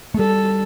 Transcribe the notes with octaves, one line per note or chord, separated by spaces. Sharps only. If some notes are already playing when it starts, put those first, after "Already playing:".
A3
G3 A4